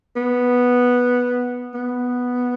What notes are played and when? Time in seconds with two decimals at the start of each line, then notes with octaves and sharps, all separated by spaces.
0.16 B3
1.74 B3